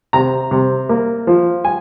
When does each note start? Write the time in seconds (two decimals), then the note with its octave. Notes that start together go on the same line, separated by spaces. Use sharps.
0.13 C3 A#5
0.51 C3
0.89 A#3
1.27 F3
1.64 G#5